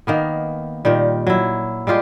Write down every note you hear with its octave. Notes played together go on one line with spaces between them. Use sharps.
D#3 A#3 B3
A#2 D#3 G3
F#3 E4
G3 G#3 F4 G4